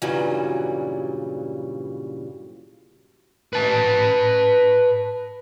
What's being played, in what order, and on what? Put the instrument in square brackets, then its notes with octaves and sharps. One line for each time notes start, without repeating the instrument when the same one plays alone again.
[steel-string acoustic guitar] G2 A#2 C#3 E3 F#3 G3
[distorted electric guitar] B4 A5